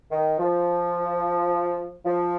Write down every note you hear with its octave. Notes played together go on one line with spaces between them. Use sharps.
D#3
F3
F3